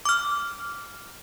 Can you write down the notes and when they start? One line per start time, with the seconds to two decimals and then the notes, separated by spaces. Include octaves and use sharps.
0.05 D6 F6